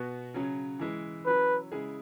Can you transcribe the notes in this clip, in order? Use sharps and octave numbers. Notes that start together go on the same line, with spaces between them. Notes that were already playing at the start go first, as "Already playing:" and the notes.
Already playing: B2 B3 F#4
C#3 F#3 C#4
E3 G#3 E4
F#3 C#4 E4 B4
C#3 G#3 E4 G#4